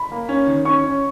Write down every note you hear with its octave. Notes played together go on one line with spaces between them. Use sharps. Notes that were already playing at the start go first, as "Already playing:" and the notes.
Already playing: B5
A#3
C#4
D#3
C#4 C#6
C#4